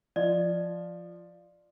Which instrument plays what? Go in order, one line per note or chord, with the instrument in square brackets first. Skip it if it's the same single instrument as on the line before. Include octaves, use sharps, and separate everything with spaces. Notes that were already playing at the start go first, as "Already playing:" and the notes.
[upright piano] F3 [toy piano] D5 D#5